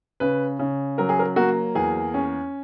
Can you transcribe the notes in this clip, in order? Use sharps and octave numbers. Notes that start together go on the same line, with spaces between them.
C#3 B4
C#3
F#3 A#4
G#4
A#4
A#3 F#4
E2 G#4
C#4